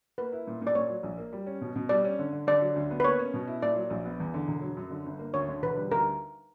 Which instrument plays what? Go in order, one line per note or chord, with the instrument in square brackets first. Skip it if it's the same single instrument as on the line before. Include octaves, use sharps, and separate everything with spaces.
[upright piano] A#3 [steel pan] B4
[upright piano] E4
A#2
A#2
[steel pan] D5
[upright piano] A#2 [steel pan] C#5
[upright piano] F#3
A#1
A#3
G3
C#4
B2
B2
[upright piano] G3 [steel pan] D5
[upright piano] C#4
D3
D3
[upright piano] D3 [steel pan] D5
[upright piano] F#3
D2
B3
[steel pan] B4
[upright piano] A#3 [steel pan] C#5
[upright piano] C#4
B2
E4
[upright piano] A#2 [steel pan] D5
[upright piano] F#3
A#1
B3
E2
D3
E1
F#3
F#2
D3
G1
A#3
[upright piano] D2 [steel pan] C#5
[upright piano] D3
[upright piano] E1 [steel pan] B4
[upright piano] G3
[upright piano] D2 [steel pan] A#4